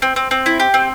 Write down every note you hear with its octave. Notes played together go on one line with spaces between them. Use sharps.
C4
C4
C4
E4
G4
C4